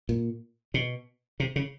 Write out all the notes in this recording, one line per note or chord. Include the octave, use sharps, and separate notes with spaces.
A#2
B2
C3
C#3